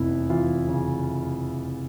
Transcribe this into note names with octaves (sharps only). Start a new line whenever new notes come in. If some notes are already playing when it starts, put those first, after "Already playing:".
Already playing: F1 E2 E4
E3 F4
C#3